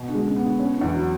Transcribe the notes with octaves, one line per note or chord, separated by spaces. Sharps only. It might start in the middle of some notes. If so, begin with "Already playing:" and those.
Already playing: B2
D3 G#3
C#3
B3
D3
C#3 C#4
D3
E2
F#3